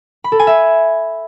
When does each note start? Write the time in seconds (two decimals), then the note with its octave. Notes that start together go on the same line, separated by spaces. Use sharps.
0.24 B5
0.32 A4
0.39 G#5
0.47 E5